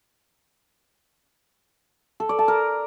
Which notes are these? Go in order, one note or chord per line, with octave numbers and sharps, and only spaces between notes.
A4
D5
A5
A#4